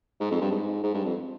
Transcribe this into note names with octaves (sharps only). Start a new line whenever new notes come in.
G#2
F2
G2
G#2
G#2
G2
F2